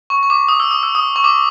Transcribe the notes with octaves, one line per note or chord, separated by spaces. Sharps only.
C#6
C#6
D6
D#6
E6
D#6
E6
D#6
C#6
D6